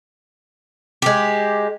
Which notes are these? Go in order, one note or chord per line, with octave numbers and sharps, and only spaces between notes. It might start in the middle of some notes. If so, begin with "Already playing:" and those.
G#3 G4